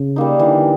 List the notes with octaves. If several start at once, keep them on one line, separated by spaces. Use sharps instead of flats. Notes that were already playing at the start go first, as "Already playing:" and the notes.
Already playing: C#3
G3 A#3 D#4
D3 E3